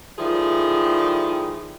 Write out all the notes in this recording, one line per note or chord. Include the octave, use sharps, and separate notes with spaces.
D#3 F3 G3 A3 E4 G#4